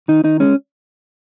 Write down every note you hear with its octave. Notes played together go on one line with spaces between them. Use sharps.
D#3 D#4
D#3 D#4
G#3 C#4